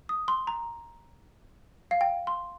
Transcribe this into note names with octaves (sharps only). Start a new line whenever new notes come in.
D#6
C6
A#5
F5
G5
C6